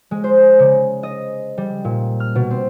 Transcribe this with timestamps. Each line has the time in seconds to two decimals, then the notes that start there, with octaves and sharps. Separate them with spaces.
0.11 G#3
0.24 C5
0.59 C#3
1.03 D#5
1.58 G3
1.84 A#2
2.20 F6
2.35 B2
2.50 C4